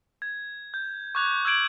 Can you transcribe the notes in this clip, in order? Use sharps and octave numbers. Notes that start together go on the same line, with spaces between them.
G#6
G6
C#6 D6 F#6 G#6 F7
E6 G6 G#6 D7 F#7